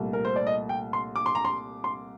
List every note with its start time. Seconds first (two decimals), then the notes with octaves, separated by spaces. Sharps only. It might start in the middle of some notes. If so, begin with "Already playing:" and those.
Already playing: C2 A#2 A3
0.13 A#4
0.25 C5
0.36 D5
0.47 D#5
0.69 G5
0.93 C6
1.16 D6
1.26 C6
1.35 A#5
1.45 C6
1.84 C6